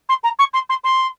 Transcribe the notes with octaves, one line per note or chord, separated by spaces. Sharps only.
C6
A#5
C#6
C6
C6
C6